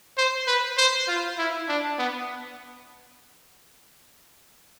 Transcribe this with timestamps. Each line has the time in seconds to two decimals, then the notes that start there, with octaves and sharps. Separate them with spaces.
0.17 C5
0.47 B4
0.77 C5
1.08 F4
1.38 E4
1.68 D4
1.98 B3